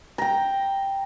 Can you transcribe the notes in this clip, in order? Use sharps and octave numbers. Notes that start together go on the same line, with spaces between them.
G5 A#5